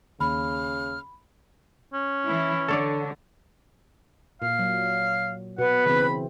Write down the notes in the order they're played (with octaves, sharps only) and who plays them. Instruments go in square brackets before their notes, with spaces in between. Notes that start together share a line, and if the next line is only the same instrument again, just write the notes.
[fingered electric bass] D#2 [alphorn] C#3 [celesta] B5 [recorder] F6
[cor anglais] C#4
[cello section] E3 E4
[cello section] D3 [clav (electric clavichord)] A4 C#5 D5
[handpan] A#2 [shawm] F5
[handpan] F#3
[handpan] B2 [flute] B4 [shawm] F#5
[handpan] C#3 E3 C4 [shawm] B5